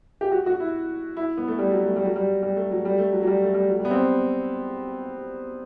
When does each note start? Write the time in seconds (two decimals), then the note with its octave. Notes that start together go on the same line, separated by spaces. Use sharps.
0.21 G4
0.32 F#4
0.46 F#4
0.60 E4
1.17 E4
1.37 B3
1.48 A3
1.58 G3
1.72 F#3
1.86 A3
1.96 G3
2.05 F#3
2.16 G3
2.42 G3
2.56 A3
2.71 F#3
2.85 G3
2.98 A3
3.12 F#3
3.23 F#3
3.27 G3
3.44 A3
3.54 G3
3.69 F#3
3.79 G3
3.85 B3
3.90 C4